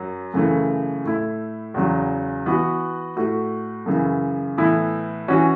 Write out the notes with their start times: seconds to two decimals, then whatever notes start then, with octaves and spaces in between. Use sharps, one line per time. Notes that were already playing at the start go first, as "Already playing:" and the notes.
Already playing: F#2 F#3
0.34 F#2 C#3 E3 A3
1.04 A2 A3 E4
1.74 E2 C#3 F#3
2.46 E3 B3 F#4
3.16 A2 A3 F#4
3.86 F#2 C#3 E3
4.57 A2 E3 B3 E4
5.28 E3 C#4 F#4